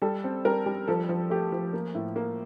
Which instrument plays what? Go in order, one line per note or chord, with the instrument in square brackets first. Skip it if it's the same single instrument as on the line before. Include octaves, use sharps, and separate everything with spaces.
[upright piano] G3 A4
C4
G3 A#4
G3
F3 A4
F3
A3 G4
F3
A#3
A2
A#3